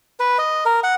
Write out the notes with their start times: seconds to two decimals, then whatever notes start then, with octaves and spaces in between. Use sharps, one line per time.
0.20 B4
0.38 D#5
0.65 A#4
0.84 F#5